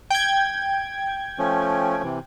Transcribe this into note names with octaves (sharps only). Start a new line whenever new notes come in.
G5 G#6
F3 A3 C#4
C3 E3